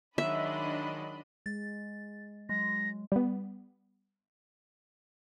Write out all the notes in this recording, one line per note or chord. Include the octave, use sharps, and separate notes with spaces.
D#3 F#3 G#3 D4 D#5 E5 B5
G#3 A6
F#3 G#3 A#6
G3 B3